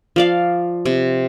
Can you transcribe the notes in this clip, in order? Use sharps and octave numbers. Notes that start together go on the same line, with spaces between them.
F3 D5 F5
C3